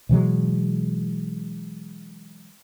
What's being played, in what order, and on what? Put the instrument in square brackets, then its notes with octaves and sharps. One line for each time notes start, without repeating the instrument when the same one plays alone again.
[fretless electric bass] B2 E3 F#3 G#3